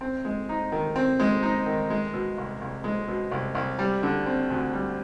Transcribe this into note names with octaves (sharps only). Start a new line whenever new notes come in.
C4
G#3
D#4
D#3
C4
G#3
D#4
D#3
G#3
B2
C2
C2
G#3
B2
C2
C2
G3
D3
C4
D2
G3